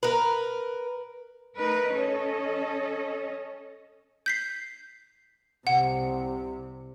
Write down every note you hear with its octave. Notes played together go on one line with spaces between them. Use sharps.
A#4 B4
A3 D#4 A#4 B4
C#4 A4 C#5 D#5
G6 B6 C7
C2 C3 F#5